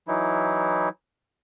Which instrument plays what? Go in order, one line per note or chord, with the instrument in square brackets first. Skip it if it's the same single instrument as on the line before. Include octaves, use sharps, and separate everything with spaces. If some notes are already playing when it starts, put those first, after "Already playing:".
[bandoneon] E3 F#3 D#4 E4